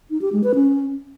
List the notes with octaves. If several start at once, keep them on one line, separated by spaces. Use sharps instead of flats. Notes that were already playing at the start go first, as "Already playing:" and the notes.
D#4
G4
G#3
B4
C#4